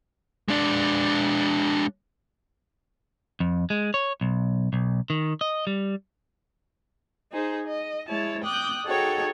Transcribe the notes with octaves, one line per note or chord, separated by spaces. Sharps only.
G#3 D4
F2
G#3
C#5
B1
B1
D#3
D#5
G3
D#4 G#4 C5
D#5
G#3 E4 C#5 A5
G5 D6 D#6 F#6 G6
D#4 F#4 G#4 A4 C#5 G5